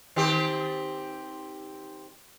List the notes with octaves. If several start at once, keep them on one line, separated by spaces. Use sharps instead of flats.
D#3 C4 G4